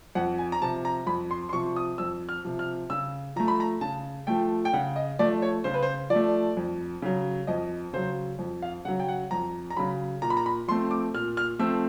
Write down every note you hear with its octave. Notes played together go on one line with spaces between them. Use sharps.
F2 F#5
G#5
A#5
C3 F3 A5
A#5
F2 B5
C6
C6
C3 F3 C#6
D#6
F2 E6
F6
C3 F3
F6
C#3 E6
F3 A3 A#5
B5
A#5
C#3 A5
F3 A3 G5
G5
C#3 F#5
D#5
F3 A3 D5
C#5
C#3 C5
B4
C5
F3 D5
A3
F2
C#3 F#3
F2 D#5
C#3 F#3 C5
F2
F5
C#3 F#3 F#5
G5
F#5
F2 A#5
A#5
C#3 F#3 B5
A#2 A#5
B5
A#5
B5
F3 A3 C4 C6
D6
A#2 F6
F6
F3 A3 C4 E6